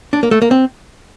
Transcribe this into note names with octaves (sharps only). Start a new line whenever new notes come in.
D4
A#3
A3
A#3
C4